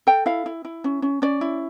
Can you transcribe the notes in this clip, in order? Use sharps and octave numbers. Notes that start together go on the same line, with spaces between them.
A4 G5
E4 F5
E4
E4
C#4
C#4
C#4 D5
E4